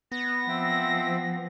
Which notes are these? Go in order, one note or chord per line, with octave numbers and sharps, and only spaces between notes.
B3 A#6
F3 C4 E5 G5